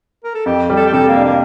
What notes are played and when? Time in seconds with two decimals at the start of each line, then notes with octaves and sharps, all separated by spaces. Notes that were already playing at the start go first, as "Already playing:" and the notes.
0.24 A#4
0.35 A4
0.46 F2 G4
0.70 G3
0.77 A4
0.87 G4
0.93 C3 A4
1.08 A#3
1.16 D4
1.24 A#3